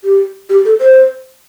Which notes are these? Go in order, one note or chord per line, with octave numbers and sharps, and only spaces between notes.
G4
G4
A4
C5